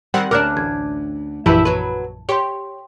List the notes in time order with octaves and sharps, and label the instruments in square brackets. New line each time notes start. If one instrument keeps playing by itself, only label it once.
[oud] D#3 [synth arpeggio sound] G3 C4 F#5
[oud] D2 C#4 D4 [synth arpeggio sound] A#4 [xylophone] D6 F6 F#6
[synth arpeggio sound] A1 [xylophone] G#6
[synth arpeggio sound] A#1 F#2 E3 [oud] E4 G4 B4 [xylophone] A5
[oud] F#3 B4
[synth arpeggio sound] G4 [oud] C#5 [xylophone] G5 C6